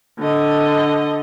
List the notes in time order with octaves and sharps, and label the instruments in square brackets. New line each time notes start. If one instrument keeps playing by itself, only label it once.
[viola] D3 D#5